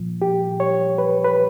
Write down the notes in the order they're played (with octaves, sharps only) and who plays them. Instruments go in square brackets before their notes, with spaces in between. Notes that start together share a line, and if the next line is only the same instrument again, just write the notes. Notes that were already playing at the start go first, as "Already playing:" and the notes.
Already playing: [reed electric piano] A#2 F3
G4
C#5
B4
B4